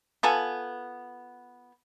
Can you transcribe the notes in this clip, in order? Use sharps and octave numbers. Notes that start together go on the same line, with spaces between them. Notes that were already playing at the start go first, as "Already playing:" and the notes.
B3 F4 A4 G#5